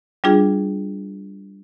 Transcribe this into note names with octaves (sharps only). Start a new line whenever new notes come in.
G3 D4 F4 G#4